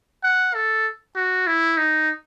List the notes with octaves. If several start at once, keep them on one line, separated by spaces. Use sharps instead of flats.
F#5
A4
F#4
E4
D#4